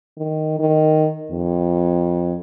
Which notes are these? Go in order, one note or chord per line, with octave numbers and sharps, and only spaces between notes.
D#3
D#3
F2